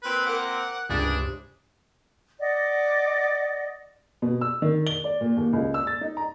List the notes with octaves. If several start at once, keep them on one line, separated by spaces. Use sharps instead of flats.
A#2 C4 B4
A#4 F#5 D6
C#2 G2 C3 G3 D4 G#4
D5 D#5 F#5
B2
E6
D#3
G7
D5
A#2
D#2
C#2
E6
A6
D#4
A#5